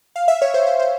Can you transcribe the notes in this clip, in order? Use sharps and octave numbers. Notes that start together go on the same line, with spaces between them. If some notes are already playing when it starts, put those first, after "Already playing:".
F5
E5
C#5
C5
C5
C5